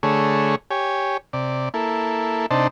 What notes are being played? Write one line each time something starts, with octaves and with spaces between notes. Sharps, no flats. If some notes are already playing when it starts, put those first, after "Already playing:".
D3 A3 G#4 C#5
G4 C#5 G#5
C3 D5
A#3 E4 A4
C3 D4 D#4 C5 A5